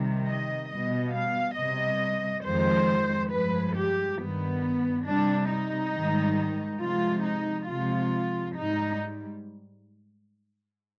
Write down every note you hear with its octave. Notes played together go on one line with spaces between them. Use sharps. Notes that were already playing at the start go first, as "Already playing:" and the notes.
Already playing: C3 D#3 G3
D#5
B2 G3 D#5
F5
C3 G3 D#5
F2 D#3 G#3 C5
G2 F3 G#3 B4
G4
G2 D#3 G3 B3
C3 G3 D4
D#4
G#2 D#3 G3
C3 F3 G#3 F4
D#4
C3 F3 G#3 F4
G#2 G3 D#4